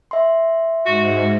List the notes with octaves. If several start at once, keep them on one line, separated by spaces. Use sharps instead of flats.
E5 C6
G#2 F#4